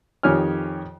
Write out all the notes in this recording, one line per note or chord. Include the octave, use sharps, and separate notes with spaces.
F2 D#3 G4 C#5 G#5 F6